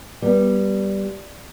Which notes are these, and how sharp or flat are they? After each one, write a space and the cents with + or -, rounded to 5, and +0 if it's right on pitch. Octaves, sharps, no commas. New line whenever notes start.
G3 -5 B3 -20